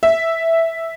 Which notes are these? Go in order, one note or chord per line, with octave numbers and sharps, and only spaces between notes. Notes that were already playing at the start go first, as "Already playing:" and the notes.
E5